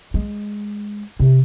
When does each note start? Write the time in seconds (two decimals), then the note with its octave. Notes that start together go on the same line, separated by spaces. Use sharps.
0.14 G#3
1.20 C3